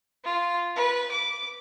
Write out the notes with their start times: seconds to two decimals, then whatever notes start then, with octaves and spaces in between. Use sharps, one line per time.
0.24 F4
0.75 B4
1.11 D6